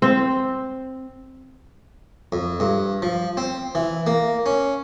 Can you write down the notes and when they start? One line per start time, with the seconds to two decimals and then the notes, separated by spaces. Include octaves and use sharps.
0.02 C4
2.32 F2
2.60 G2
3.02 F3
3.37 C4
3.75 E3
4.07 A#3
4.46 C#4